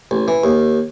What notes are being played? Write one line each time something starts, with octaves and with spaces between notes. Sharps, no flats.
A1
E3
D#2